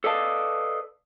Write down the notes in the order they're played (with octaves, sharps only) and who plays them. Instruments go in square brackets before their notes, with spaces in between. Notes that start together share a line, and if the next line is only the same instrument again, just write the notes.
[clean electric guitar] A4 B4 D5 D#5 F5 A5